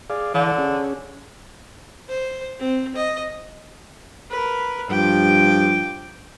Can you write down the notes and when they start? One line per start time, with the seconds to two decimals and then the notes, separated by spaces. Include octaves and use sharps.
0.10 G#4 D5 F5
0.34 D3 E3
0.58 C#4 G#4
2.09 C5
2.59 C4
2.96 D#5
4.30 A#4 B4
4.90 G2 F3 G5 D6